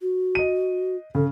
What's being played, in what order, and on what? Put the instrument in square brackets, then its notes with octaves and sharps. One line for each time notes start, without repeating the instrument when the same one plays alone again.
[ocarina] F#4
[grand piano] D#5 D#7
[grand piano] C#3 [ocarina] A4